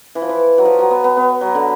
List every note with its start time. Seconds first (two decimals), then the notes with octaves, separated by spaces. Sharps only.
0.15 E3
0.22 F3
0.29 E3
0.58 F#3
0.65 F3
0.79 F#3
0.91 B3
1.04 B3
1.17 B3
1.41 F#3
1.55 D3